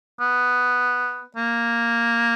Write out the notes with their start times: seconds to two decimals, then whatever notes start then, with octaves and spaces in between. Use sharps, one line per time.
0.20 B3
1.37 A#3